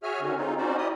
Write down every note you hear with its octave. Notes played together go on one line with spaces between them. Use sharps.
F#4 G#4 C#5 E5 G#5 F6
D3 D#3 C#4 F#4
G#3 C4 D#4 F4
C4 C#4 D#4 F#4 C5 D5
E4 G4 D5 D#5 D#6